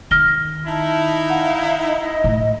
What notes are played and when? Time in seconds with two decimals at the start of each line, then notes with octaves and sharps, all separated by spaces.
0.11 D#3 F6 A#6 G7
0.67 D#4 E4 A5
1.30 F5 F#5
1.86 D#5
2.24 A2